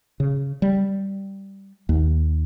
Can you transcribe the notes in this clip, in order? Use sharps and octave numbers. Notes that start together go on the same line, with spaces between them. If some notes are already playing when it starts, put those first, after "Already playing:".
C#3
G3
D#2